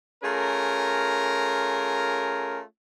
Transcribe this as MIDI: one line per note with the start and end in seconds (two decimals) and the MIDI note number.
0.23 2.61 57
0.23 2.61 61
0.23 2.61 65
0.23 2.61 68
0.23 2.61 70